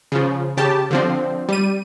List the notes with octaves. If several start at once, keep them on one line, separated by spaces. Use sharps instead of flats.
C#3 F3
C#3 G4 A5
D3 F3 C4
G3 D#7